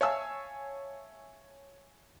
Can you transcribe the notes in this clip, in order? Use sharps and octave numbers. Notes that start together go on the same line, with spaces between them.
C#5 E5 F5 G#5 A5 E6